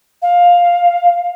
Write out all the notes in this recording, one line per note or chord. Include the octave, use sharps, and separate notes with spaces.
F5